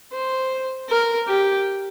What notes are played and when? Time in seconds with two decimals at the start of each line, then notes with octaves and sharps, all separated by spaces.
0.12 C5
0.89 A#4
1.28 G4